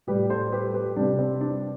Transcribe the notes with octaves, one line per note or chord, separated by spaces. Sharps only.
A2 G3 G4 B4
A4 C5
G4 B4
G4 B4
C3 G3 D4
C4
D4